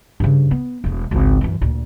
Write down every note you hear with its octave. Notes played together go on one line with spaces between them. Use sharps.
G2 C#3
B3
E1 A3
G#1 C#2
F#2 E3
D2 A#2